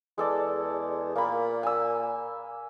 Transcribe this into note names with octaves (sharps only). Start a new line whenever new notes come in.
E2 G#3 A4 D5
A#2 A#3 B5
G#5 E6